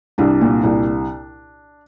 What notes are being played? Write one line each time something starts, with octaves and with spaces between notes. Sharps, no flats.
C2 D4
A#2
C2